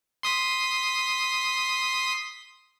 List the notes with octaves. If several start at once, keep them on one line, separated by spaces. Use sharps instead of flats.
C6 D#6 B6